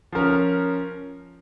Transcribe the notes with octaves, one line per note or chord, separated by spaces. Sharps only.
F3 C#4 A#4